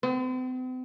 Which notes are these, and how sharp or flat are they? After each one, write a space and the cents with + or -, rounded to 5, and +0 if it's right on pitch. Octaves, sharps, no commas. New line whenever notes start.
C4 -45